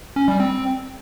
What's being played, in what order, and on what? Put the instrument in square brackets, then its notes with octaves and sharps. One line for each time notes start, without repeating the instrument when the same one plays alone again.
[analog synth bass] C#4
G3
C4